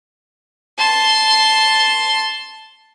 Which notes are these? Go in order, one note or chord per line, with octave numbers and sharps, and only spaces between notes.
A5 C6